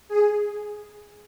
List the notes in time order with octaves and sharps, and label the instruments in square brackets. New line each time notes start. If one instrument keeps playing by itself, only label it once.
[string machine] G#4